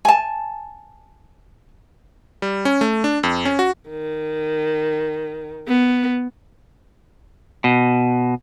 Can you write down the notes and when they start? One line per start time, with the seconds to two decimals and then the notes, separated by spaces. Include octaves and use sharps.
0.05 G#5 A5
2.42 G3
2.65 C#4
2.81 A3
3.04 D4
3.23 F2
3.45 C#4
3.59 F#4
3.89 D#3
5.68 B3
7.64 B2